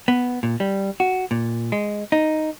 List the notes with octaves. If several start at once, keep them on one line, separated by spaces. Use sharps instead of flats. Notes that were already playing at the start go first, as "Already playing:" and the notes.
B3
A#2
G3
F#4
A#2
G#3
D#4